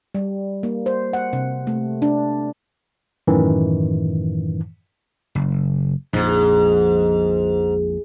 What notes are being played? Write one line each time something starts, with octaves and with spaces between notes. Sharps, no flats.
G3
A#3
C5
F#5
C3
A3
D4
F#2 A2 D#3 E3
F#1
A#1 F2 G#2